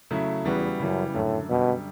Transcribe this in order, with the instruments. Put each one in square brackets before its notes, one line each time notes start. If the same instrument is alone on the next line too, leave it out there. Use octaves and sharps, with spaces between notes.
[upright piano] C#3 F#3 A3 E4
[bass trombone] E2 [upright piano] C#3 E3 G3 B3 F#4
[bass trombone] F#2 [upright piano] C#3 E3 G3
[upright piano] F#2 D3 A3 [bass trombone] A2
[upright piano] F#2 D3 G3 [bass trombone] B2